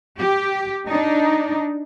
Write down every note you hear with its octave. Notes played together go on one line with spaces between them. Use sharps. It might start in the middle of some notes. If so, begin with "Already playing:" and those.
G4
D4 D#4